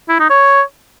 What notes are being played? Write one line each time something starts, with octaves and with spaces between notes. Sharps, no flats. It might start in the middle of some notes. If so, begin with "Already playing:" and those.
E4
D#4
C#5